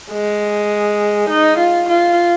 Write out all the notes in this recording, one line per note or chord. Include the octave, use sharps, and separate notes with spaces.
G#3
D#4
F4
F4